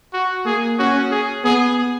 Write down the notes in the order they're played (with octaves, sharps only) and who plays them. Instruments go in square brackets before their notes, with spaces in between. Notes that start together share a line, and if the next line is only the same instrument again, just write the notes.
[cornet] F#4
[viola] A#3 [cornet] G#4
[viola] C#4 [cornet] F#4
[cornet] G#4
[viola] B3 [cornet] G#4